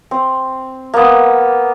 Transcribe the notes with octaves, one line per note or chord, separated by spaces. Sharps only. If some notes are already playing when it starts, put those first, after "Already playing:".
C4
A#3 B3